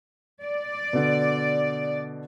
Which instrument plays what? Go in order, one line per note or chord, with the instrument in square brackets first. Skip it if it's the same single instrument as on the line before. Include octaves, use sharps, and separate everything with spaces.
[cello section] D5
[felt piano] B2 D3